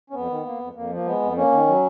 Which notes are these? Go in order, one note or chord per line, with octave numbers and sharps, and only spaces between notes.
C#4
F2 B3
D#3
A#3
F2
F2 A#3
F3 A#3
G#3 B3
F2
A#3 C#4
D#3
F#3